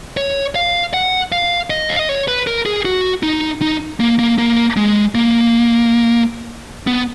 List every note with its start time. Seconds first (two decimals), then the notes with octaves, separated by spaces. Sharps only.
0.17 C#5
0.55 F5
0.94 F#5
1.32 F5
1.70 D#5
1.89 F5
1.99 D#5
2.09 C#5
2.28 B4
2.47 A#4
2.66 G#4
2.85 F#4
3.23 D#4
3.62 D#4
4.00 A#3
4.19 A#3
4.38 A#3
4.77 G#3
5.15 A#3
6.87 B3